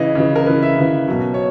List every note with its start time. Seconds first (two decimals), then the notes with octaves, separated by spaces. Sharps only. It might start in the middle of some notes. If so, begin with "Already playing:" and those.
Already playing: C#3 E3 D#5
0.15 C#3 E3
0.35 A#4
0.46 C#3 E3 B4
0.62 E5
0.77 C#3 E3
1.08 B2 F#3
1.34 C#5